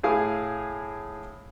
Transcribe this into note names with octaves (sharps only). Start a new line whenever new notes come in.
A2 G#4 F5